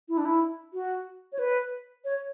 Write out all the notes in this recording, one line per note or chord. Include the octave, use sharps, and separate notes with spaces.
E4
D4
E4
F#4
C#5
B4
C#5